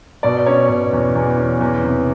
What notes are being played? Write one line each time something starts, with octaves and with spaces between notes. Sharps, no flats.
B2 D5
C#4 C#5
B2 C#5
E2
E2
C#4
E2
C3